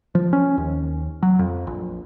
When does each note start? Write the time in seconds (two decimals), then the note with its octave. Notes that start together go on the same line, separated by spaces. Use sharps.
0.15 F3
0.33 C#4
0.58 D#2
1.23 F#3
1.39 F2
1.67 A#1